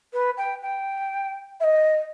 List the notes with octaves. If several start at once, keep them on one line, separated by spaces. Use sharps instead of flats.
B4
G5
G5
E5
D#5